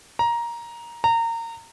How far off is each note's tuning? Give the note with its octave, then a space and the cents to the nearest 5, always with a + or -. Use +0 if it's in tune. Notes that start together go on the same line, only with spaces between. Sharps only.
A#5 +10
A#5 -25